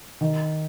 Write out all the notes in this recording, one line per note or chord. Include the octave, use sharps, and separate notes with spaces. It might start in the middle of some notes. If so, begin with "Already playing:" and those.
D#3